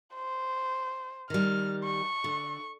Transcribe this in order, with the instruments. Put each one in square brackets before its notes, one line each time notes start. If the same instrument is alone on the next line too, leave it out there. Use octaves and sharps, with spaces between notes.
[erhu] C5
[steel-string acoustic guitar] D#3 G3 [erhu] F6
[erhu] C#6
[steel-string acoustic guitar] D3